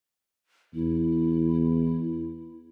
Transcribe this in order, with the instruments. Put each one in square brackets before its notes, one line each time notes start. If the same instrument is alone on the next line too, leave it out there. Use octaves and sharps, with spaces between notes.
[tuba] E2 [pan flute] E4